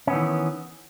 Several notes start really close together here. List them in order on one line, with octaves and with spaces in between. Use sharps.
C#4 B3 E3 D#3